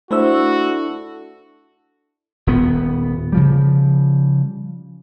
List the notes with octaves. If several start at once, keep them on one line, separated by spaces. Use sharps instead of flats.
A3 D4 E4 F#4 A4 C5 E6
D#1 B3
C#3 F3 G3